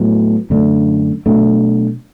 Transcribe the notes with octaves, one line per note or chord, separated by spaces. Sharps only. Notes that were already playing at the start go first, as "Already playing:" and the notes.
Already playing: A2 F#3 B3
F#2 D3 A3 D4
B2 F#3 A3 D4